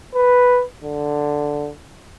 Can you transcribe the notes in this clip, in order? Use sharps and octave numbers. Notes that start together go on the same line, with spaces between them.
B4
D3